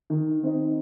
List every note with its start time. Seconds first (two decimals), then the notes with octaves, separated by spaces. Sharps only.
0.10 D#3
0.43 C4 D#4